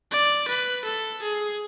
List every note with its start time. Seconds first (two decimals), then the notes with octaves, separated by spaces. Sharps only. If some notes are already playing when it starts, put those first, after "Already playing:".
0.11 D5
0.48 B4
0.85 A4
1.22 G#4